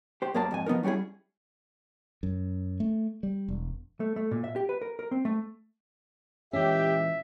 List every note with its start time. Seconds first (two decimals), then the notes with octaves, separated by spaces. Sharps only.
0.22 G4 C5
0.34 F#2 A#3 G#4 A#4 D5 A5
0.51 F2 G#2 G#5
0.66 F3 B3 D#4 A#4
0.83 F#3 G3 C#4 E4 G#4
2.23 F#2
2.80 A3
3.23 G3
3.48 E1
4.00 A3
4.16 A3
4.31 A#2
4.44 E5
4.56 G4
4.69 B4
4.82 A#4
4.99 A#4
5.11 C4
5.25 A3
6.53 A#2 E3 G#3 C#4 G4 E5